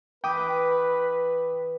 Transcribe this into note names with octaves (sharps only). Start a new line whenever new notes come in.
E3 B4 G5 D6 D#6